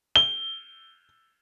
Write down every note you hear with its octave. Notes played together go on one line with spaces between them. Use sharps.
G7